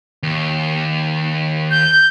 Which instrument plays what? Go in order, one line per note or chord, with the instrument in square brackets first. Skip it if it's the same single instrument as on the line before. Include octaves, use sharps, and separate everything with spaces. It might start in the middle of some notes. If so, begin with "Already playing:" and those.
[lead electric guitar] D#2
[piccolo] G6